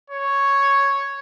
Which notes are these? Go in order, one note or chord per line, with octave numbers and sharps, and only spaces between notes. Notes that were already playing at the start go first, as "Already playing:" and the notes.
C#5